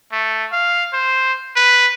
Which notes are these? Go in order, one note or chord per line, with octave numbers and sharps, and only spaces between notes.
A3
F5
C5
B4